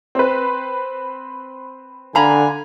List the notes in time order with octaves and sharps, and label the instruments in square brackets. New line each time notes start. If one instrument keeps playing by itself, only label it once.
[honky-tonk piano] C4 B4
[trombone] D3 [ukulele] F5 A#5 B5 [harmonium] G#5